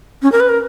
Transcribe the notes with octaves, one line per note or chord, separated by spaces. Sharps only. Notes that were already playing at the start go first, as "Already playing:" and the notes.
C#4
A#4
B4
A#4